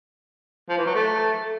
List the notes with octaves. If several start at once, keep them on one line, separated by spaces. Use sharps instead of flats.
F3
E3
F#3
A3